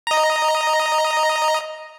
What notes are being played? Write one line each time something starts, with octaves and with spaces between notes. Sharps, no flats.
D#5 A#5